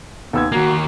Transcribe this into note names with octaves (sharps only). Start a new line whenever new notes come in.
D#2 B3 E6 G#6
D#2 A#3 F#4 A#5 G#6